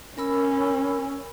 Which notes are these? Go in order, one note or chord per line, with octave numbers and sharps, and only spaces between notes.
C#4 A#4 B5 E6